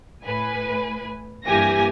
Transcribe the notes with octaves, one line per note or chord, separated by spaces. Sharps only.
A2 B4 G#5
G2 E3 A#3 G4 G#5 A#6